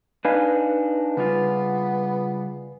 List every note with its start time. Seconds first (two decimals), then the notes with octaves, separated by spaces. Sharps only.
0.25 D4 D#4 B4 D#5 F5 G#5
1.17 C#3 G3 B3 F4